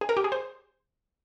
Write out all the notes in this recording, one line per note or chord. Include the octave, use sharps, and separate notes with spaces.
G#4
A#4
G4
G#4
C5